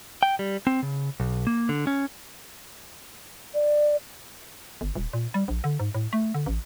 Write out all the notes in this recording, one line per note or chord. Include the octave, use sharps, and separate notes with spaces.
G5
G3
C4
C#3
B1
A#3
D3
C#4
D5
G1
D#1
A#2
G3
A#1
D3
G#2
A2
A3
D3
A1